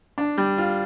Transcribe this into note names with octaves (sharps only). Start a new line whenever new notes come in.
D4
G3
F4